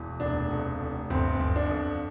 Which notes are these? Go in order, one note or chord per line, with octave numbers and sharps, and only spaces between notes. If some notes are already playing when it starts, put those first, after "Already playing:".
Already playing: E1 E3
F1 D4
F2
F1
G1 C4
G1
D4
F2